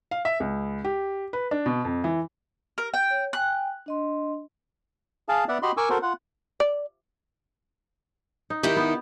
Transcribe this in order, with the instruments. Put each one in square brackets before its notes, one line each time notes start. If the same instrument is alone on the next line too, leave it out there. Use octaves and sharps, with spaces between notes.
[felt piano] F5
E5
C#2
G4
B4
D4
B2
F2
E3
[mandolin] A#4
G5
[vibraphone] C#5
[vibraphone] G5 G#5 [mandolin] F#6
[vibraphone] D4 D#5 C6
[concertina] G#4 F5 A5
B3 D5 E5 F#5
F#4 G4 D#5 B5 C6
A#4 G#5 C#6 D6 E6
F#4 A4 A#4 C5
F4 F#5
[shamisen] D5
[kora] D#4
[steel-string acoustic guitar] D#3 D#4 E4 [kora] G4 G5
[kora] B3